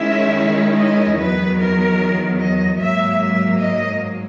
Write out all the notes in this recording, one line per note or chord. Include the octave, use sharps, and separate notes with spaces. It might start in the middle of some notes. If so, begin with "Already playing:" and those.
Already playing: D#3 G#3 C#4 E4 E5
D#5
E2 D#3 F#3 B3 B4
A#4
D#5
G#2 F#3 A#3 E5
E5
D#5